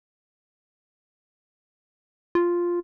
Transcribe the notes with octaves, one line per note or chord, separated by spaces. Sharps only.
F4